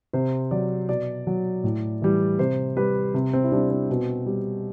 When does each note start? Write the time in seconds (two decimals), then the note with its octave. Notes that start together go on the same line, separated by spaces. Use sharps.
0.13 C3 C5
0.51 F#3 D5
0.89 B2 D5
1.27 F#3
1.64 A2
2.02 E3 G3
2.39 C3 C5
2.77 G3 B4
3.14 C3
3.33 C4
3.44 E4
3.52 G3 D4
3.70 C4
3.90 B2
4.26 G3